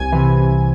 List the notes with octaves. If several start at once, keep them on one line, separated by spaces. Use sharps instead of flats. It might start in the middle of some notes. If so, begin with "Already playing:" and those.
Already playing: C2 G#5
C3 E3
C2